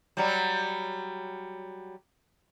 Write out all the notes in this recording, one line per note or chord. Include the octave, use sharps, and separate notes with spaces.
F#3 G3